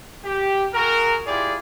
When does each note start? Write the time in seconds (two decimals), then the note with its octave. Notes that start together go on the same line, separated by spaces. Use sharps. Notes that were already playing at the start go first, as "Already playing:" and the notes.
0.25 G4
0.74 F#4 G#4 A#4
1.26 E4 F4 G4 G#4 D5